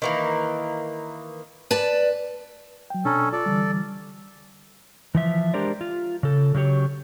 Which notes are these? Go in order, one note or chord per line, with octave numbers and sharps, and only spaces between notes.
D#3 E3 A#3
B4 D5 A5
F#3 G5
B2 C#4 D4 A4 A#5
F4 A4 D5
D3 E3 G3
E3 F3 E5
G#3 D4 G4 A#4 C5 D5
F4
C#3 A4
C#3 F#3 G4 C#5